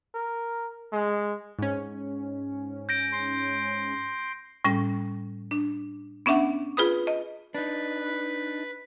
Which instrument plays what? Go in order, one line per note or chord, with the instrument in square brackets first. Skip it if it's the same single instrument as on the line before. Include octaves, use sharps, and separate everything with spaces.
[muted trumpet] A#4
G#3
[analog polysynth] G#2 C#4
[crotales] G6 A#6 D7
[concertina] C6
[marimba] A2 G3 C#4
D4
B3 C#4 D4 E5 F#5
F4 G#4 B4 B5 D#6
D#5
[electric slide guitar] D4 D#4 [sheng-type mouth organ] B4